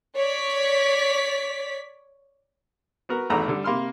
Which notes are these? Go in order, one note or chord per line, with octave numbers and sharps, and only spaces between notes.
C#5 D5 B6
B3 F#4 A#4
G#1 E2 A3 D#4 A#5 B5
D3 G3
C3 A#3 B5 C6 F6